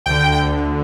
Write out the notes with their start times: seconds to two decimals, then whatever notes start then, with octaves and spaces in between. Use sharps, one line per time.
0.06 D2 D3 G5
0.32 G5